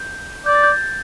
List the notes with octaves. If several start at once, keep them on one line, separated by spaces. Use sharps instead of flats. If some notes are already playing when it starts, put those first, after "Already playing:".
Already playing: G6
D5 G6
A6
G6